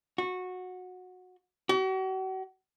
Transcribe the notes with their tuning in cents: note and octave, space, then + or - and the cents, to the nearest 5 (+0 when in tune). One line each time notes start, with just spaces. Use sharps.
F#4 -15
F#4 +40